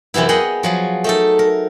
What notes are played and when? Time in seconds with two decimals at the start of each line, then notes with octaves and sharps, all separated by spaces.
0.14 F#2 C3 E3 B3 E4
0.29 G#4 D5 D#5 F#5 G5
0.63 F3 F#3 G#4
1.04 A3 D#4 A4
1.39 A#4